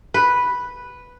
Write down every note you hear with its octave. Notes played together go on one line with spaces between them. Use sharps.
B4